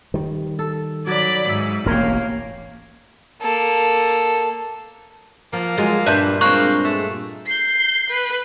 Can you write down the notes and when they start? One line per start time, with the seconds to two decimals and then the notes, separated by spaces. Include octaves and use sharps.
0.14 D#3 G3
0.59 A4
1.07 F#3 D5 B5
1.49 G#2 E5
1.86 E1 A1 A#3 A#4 C#5 G5
3.42 A#3 A4
5.53 F3 A#3
5.78 F#3 G#3 F4
6.06 G2 A#2 B4 D5 E5 A5 G6
6.41 G#3 A#3 C4 C#6 F#6
6.84 A3
7.46 G6 C7
8.10 B4